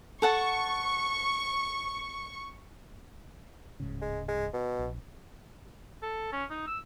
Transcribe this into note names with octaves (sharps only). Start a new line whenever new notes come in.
A4 F#5 A5 C#6
D1 G#2 C#3
G#3
G#3
B2
A#1
A4
C#4
D#4
E6